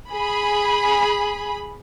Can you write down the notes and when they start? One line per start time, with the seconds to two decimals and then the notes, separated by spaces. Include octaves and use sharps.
0.12 G#4 B5